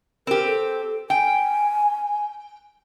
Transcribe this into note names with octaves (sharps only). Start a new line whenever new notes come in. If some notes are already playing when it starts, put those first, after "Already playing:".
C4 G4 A#4
A4
G5 G#5